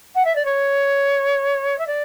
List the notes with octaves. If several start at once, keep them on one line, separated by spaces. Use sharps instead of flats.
F#5
E5
D5
C#5
E5
D5